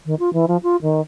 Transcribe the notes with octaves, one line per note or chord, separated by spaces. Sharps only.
D#3
F4
E3
F3
F4
D#3